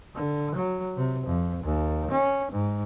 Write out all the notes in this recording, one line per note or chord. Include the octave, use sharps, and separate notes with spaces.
D3
F#3
C3
F2
D#2
C#4
G#2